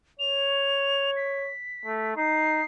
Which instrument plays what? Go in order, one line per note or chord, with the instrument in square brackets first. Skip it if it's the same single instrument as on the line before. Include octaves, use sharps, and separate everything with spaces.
[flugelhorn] C#5 [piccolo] F7
[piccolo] B6
[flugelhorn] A3
[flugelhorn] D#4 [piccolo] C7